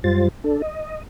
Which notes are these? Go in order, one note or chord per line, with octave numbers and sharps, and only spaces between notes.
F#2 G3 F4 C5 A6
D4 A4
D#5